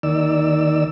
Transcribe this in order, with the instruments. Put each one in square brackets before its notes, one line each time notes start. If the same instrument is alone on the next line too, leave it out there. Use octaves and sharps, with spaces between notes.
[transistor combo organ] D#2 D#3 D5 E6